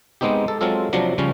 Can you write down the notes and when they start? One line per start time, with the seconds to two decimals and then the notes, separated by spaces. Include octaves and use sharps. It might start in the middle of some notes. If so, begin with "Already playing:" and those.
0.21 G#3 B3 C4 D#4 G4
0.48 A4
0.61 F#3 G#3 C4 F4 A4
0.93 C3 F3 F#3 D4
1.18 C#3 F3 G3 C#4